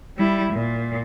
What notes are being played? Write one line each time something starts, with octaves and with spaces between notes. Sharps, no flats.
G3 E4
A#2